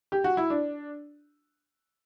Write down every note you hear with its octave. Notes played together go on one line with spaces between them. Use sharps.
G4
F#4
E4
D4